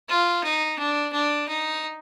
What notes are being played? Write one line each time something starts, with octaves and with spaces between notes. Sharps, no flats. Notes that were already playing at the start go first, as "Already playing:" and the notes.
F4
D#4
D4
D4
D#4